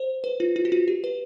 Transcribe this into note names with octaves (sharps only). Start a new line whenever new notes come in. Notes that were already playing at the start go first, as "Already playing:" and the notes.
Already playing: C5
B4
F4
F4
F#4
F4
G4
B4